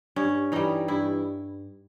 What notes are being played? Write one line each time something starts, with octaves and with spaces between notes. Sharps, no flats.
G2 C#4
E3 G3 D#4
G2 E4